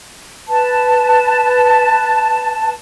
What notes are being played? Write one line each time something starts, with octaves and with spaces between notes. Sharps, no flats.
B4 A5